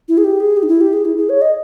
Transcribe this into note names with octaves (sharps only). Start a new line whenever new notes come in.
E4
G#4
G4
G#4
G4
D#4
E4
G4
G#4
E4
G#4
C#5
D#5